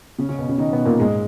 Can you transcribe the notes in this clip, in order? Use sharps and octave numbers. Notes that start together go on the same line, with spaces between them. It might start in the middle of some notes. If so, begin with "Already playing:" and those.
C#3 C#4
C#3 C#4
B2 B3
C#3 C#4
D#3 D#4
B2 B3
A#2 A#3
G#2 G#3